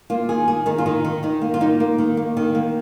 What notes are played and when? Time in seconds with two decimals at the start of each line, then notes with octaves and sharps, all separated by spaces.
0.10 A#3 F4
0.29 D#3 G#4
0.48 A#3 G#4
0.66 D#3 D#4
0.78 F4
0.86 D#3 D#4
1.05 D#3
1.23 D#3 D#4
1.42 A#3
1.54 F4
1.60 A#3 D#4
1.80 A#3
1.98 D#3
2.17 A#3
2.37 D#3
2.55 A#3